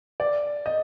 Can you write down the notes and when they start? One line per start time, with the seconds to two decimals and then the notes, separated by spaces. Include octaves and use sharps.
0.20 D5
0.66 D#5